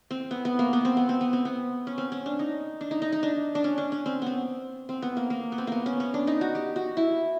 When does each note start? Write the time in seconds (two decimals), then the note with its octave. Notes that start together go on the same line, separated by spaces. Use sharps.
0.11 C4
0.31 B3
0.45 B3
0.59 A#3
0.73 B3
0.85 C4
0.97 B3
1.09 C4
1.21 B3
1.33 C4
1.45 B3
1.87 C#4
1.98 C4
2.12 C#4
2.26 D4
2.39 D#4
2.81 D4
2.91 D#4
3.02 D#4
3.12 D#4
3.23 D4
3.55 D4
3.64 C#4
3.78 D4
3.92 C#4
4.06 C4
4.22 B3 C4
4.89 C4
5.02 B3
5.17 A#3
5.30 A#3
5.52 B3
5.58 C4
5.67 A#3 B3
5.86 C#4
6.00 C#4
6.14 D4
6.27 D#4
6.41 F#4
6.55 G4
6.76 F#4
6.97 E4